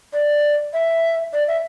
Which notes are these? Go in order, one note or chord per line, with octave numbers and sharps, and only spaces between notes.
D5
E5
D5
E5